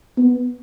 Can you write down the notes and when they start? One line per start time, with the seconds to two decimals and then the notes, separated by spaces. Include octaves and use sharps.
0.18 B3